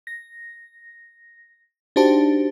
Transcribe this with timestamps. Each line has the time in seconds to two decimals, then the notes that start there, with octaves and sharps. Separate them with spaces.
0.07 A#6
1.96 D4 D#4 F#4 G4 C5 A5